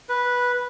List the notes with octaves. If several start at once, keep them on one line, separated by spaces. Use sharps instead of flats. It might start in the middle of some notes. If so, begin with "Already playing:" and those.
B4